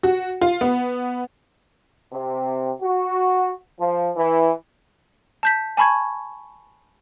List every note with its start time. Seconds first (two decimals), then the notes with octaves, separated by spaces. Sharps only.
0.03 F#4
0.41 F4
0.61 B3
2.13 C3
2.81 F#4
3.79 F3
4.17 E3
5.43 A5 G6 B6
5.77 G#5 A5 B5 C#6 G#6